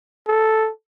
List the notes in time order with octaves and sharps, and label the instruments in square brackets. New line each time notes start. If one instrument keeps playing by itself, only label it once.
[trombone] A4